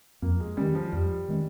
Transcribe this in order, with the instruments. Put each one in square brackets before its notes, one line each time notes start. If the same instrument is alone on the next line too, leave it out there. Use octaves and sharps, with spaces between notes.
[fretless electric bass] F2 [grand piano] A#3
[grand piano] G#3
[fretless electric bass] D#3 G#3 C#4 [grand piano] G3
[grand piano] F3
[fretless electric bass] F2 [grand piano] G3
[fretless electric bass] D#3 G#3 C#4